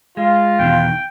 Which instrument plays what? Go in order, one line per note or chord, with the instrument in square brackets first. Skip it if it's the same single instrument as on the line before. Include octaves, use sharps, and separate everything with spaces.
[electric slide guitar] G#3 [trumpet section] F4
[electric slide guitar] E2 B2 D#3 [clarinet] G5